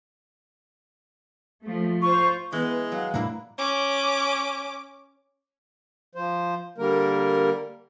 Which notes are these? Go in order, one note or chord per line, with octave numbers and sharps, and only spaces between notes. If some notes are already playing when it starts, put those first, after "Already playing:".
F3 A3
F4 C5 C#6
E3 G#3 B3
F#3 F5
A2 G3 A#3 D4 E4
C#4 D6
F3 C5
D3 G3 A#3 A#4